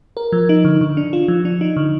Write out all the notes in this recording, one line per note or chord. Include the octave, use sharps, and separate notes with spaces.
A#4
F3
D#4
D3
D3
D4
F4
F3
D4
D#4
D3